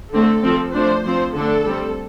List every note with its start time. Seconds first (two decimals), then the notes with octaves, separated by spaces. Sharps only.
0.12 D3 A3 C4 A4
0.43 F3 C4
0.74 F3 A3 D4 C5
1.05 F3 C4 C5
1.35 D3 A3 D4 A4
1.65 G3 C4